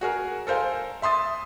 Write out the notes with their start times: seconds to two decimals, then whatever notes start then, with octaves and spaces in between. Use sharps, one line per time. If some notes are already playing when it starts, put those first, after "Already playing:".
0.01 F#4 G#4 A#4
0.47 A4 A#4 C5 F5 G#5
1.02 E5 C6 D#6 A6